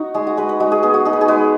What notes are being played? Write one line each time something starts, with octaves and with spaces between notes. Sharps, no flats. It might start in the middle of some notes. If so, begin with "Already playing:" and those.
Already playing: D#4 F#4
G#3 G#4
F#4
G#3 B4
B4
G#3 F#4
G#4
B3 G#4
F#4
D#4 G#4
B4
G#4
G#3 B4